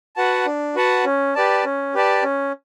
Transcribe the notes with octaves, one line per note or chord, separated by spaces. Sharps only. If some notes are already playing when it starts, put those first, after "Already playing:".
F#4 B4 F#5 A5
D4
F#4 B4 F#5 A5
C#4
G4 B4 D5 A5
C#4
G4 B4 D5 A5
C#4